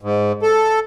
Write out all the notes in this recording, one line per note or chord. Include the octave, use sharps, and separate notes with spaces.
G#2
A4